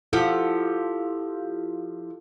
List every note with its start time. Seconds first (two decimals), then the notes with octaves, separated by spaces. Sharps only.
0.13 F3 E4 F4 G4 A4 F#5